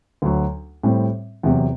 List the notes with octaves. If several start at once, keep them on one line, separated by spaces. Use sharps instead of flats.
D2 D3 F#3
A2 G3 C4
E2 C3 F#3